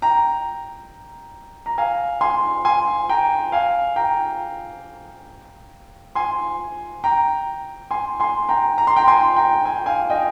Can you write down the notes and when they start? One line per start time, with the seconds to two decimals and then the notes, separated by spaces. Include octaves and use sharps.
0.02 G5 A#5
1.66 A#5
1.78 F5 G#5
2.21 G#5 C6
2.65 G#5 C6
3.09 G5 A#5
3.52 F5 G#5
3.96 G5 A#5
6.15 G#5 C6
7.04 G5 A#5
7.91 G#5 C6
8.20 G#5 C6
8.49 G5 A#5
8.78 A#5
8.87 C6
8.96 G5 A#5
9.08 G#5 C6
9.36 G5 A#5
9.65 G#5
9.77 G5
9.86 F5 G#5
10.10 D#5 G5